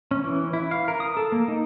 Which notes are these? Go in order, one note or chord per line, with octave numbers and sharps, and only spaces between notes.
C#4
E3
E4
F5
A#4
D#6
A4
A#3
D#4